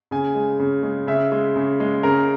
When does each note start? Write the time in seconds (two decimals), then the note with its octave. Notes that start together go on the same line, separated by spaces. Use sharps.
0.11 C#3 G#5
0.35 G#3
0.59 C#3
0.83 G#3
1.07 C#3 E5
1.32 G#3
1.56 C#3
1.80 G#3
2.03 C#3 A#4